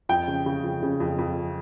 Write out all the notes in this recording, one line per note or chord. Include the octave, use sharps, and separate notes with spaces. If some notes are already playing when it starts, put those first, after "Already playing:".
F2 G5
C#3
C#3
F2
C#3
F2
F2